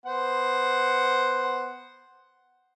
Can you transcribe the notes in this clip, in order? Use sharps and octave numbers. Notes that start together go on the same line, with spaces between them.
B3 C5 F#5